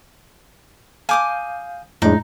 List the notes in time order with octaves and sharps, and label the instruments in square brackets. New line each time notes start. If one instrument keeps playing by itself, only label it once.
[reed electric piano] F5 G6 [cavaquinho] G#5 D6 D#6
[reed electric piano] F2 D4 [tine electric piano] A2 G#3 [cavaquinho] D#4